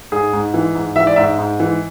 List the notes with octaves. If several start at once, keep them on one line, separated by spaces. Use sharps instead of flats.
G#2 G#4
G#2
E3
G#2
E3 E5
D5
G#2 E5
G#2
E3